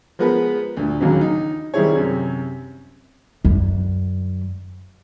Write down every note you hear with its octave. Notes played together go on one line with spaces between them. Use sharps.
F3 G#3 B3 A#4 B4
D2 A#2
A#1 D#2 C#3 F#3
D#4
D#3 G3 C4 E4 G#4 C#5
F#2 C3
F#2 D3